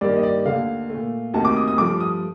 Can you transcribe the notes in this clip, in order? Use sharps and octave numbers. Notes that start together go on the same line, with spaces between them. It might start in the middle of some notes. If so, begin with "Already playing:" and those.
G2 D#3 A#3 D5
D#5
D5
D#2 D3 A3 F5
A#2 A3
D2 C3 D#3 A#3 A5
D6
D#6
D#6
G2 F3 A3 D6
D#6